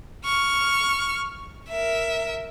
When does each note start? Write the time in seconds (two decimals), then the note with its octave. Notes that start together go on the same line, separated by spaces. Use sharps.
0.25 C#6 F6
1.69 A#4 E5